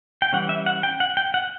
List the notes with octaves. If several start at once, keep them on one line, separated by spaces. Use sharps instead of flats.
G5
E3 G3 C#4 F#5
E5
F#5
G5
F#5
G5
F#5